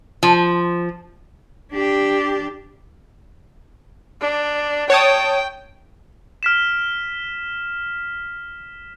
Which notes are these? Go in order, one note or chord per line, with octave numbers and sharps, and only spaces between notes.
F3
D4 G4
D4
C#5 G5 A5 D#6
F6 B6 E7